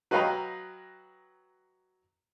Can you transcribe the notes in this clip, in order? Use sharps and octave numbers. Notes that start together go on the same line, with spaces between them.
F#3 B4 D#5 F5 G5 A#5